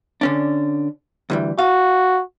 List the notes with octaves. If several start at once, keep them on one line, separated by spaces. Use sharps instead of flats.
D3 C#4 D4
D2 E3 G3
F#4 F5